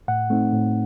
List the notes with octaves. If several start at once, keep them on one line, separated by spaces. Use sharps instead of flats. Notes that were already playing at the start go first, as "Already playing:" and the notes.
A2 F#5
A3 C4 D#4
A2